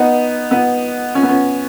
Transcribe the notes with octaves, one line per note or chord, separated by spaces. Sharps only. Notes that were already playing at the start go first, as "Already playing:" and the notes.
Already playing: B3 D#4
B3
C#4
B3
C#4